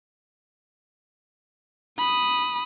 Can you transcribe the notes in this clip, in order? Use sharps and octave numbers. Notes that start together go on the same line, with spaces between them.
B5 D#6